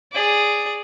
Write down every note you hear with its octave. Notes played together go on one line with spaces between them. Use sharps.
G#4 D5